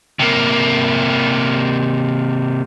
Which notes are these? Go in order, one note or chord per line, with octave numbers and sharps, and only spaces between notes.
C3 A#3